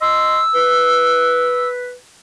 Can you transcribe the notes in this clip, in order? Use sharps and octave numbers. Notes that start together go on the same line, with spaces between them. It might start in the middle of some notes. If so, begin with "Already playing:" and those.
D#5 C6 E6
B4